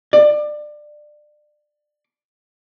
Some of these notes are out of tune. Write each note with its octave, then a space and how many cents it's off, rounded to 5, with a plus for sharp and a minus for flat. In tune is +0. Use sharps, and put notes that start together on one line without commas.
D5 +25